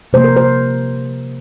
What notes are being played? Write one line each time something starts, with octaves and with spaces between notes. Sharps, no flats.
C3 F3 A#3 C5
A#4
C5